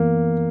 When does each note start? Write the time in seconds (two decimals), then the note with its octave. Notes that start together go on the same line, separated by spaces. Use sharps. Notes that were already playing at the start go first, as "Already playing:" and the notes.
Already playing: F#2 E3 A#3 B3